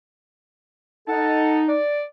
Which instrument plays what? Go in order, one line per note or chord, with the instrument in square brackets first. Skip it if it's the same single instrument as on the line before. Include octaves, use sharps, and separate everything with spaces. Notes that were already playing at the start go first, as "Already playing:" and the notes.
[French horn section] D#4 [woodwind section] A4 F#5 A5
[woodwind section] D5